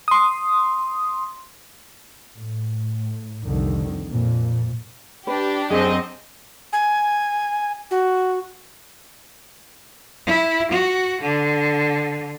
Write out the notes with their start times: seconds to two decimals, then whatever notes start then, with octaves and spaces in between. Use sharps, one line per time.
0.08 C6 D#6
2.34 A2
3.45 C2 F2 D3 D#3
4.09 F2 A#2
5.27 D4 G4 B4
5.71 F#2 C4 G#4 D#5
6.73 G#5
7.91 F#4
10.27 E4
10.72 F#4
11.22 D3